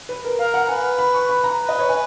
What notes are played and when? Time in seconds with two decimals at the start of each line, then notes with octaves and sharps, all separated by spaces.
0.09 B4
0.25 A#4
0.39 A#4 F5
0.54 F#5
0.69 B4 G#5
0.99 B5
1.14 C#6
1.29 B5
1.44 A#5
1.59 B4
1.69 D#5
1.79 C#5
1.89 B4 G#5